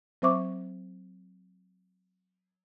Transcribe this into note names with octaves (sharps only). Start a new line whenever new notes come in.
F#3 C4 C5 E5 C#6 D6